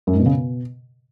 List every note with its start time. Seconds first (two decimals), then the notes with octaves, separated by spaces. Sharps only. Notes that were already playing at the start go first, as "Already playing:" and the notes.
0.07 F#2
0.13 G#2
0.20 B2
0.26 C#3
0.32 B2